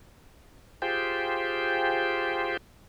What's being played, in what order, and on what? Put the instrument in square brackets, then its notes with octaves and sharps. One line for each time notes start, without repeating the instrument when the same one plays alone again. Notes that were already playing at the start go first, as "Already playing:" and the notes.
[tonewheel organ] F4 G4 G#4 C5 G5